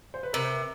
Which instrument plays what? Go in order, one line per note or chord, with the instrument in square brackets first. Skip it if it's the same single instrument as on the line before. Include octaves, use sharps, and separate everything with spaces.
[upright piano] C5
B4
[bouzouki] C3 [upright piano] A#4